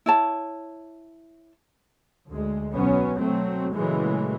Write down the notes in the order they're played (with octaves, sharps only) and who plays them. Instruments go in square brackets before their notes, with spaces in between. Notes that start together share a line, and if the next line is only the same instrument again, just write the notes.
[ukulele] E4 C#5 A5
[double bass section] D2 G#3
B1 F#3 B3 C#4
B2 F#3 A3 C4
A#2 C#3 E3 F#3 G#3 A3